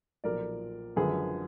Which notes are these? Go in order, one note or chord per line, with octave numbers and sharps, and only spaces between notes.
B1 A#2 F3 A#4 D5
G#1 F#2 D3 F3 G#4 B4